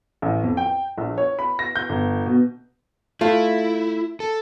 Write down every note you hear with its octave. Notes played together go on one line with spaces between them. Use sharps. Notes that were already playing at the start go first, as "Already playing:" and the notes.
A1
F2
G5
A#1
C#5
B5
A#6
G6
G1
B2
A3 E4 F4
A4